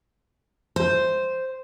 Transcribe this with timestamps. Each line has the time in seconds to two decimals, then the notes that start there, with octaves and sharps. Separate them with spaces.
0.76 C5